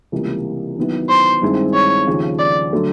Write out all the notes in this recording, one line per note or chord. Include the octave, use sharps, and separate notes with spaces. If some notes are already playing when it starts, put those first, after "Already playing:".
C#2 C3 E3 G3 A#3
D#3 F#3 B3 E4
C5
G2 D#3 G#3 C4 E4
C#5
D#2 C#3 F3
D5
D3 F#3 A3